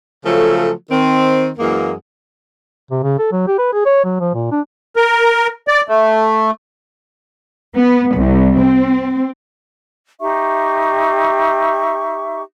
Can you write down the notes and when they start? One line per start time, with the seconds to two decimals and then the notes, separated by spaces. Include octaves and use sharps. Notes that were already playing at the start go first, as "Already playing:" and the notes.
0.24 C#3 F3 F#3 A3 A4
0.91 D#3 C4
1.58 F#2 E3 G#3 A#3
2.91 C3
3.03 C#3
3.18 A4
3.32 F#3
3.47 G4
3.58 B4
3.73 G#4
3.86 C#5
4.04 F#3
4.20 F3
4.34 A#2
4.52 D4
4.96 A#4
5.68 D5
5.89 A3
7.75 B3
8.14 C2
8.59 C4
10.20 D#4 G4 E5 C#6